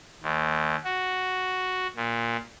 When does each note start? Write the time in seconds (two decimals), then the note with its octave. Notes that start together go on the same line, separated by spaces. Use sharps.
0.23 D#2
0.84 F#4
1.96 A#2